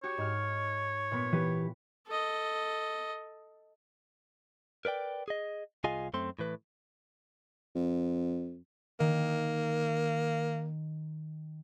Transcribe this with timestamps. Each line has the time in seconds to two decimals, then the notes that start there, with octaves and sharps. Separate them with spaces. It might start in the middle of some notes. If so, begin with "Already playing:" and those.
0.04 F#4 G4 C#5
0.18 G#2 F6
1.11 A#2 B3 B6
1.33 E3 G4 B4
2.07 A4 D#5
4.85 A#4 B4 D5 G5
5.28 G#4 D#5
5.84 C2 F4 G#4 D#5 F5 G#5
6.14 F#2 A3 C4 C6
6.39 A2 E3 B4
7.75 F2
9.00 D#3 A#3